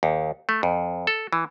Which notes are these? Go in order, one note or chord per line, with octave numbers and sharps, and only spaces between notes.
D#2
A3
F2
A4
E3